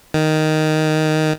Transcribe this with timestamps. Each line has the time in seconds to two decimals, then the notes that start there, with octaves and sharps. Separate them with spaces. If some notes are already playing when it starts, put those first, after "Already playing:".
0.14 D#3